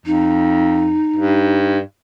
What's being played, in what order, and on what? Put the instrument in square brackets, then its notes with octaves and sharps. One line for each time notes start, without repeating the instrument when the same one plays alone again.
[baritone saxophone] F2 [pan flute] D#4
[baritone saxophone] G2